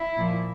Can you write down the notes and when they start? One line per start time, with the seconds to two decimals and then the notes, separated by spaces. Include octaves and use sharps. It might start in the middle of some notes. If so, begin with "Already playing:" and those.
Already playing: E4
0.17 A#2 F3